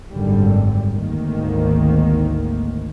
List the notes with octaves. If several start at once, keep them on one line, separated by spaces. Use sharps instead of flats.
G#1 F#2 D3 G3
G#1 D2 D#3 A#3